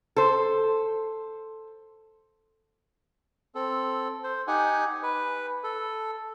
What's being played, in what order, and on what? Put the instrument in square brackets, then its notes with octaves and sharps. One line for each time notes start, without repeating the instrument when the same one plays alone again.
[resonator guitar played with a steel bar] A4 C5
[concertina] C4 A4
C5
D#4 G4 F#5 G#5
B4
A4